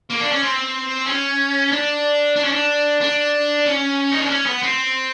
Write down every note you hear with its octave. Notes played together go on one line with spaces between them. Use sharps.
A#3
D4
C#4
C4
C#4
D4
D4
C#4
D4
D4
C#4
D#4
D4
C#4
B3
C4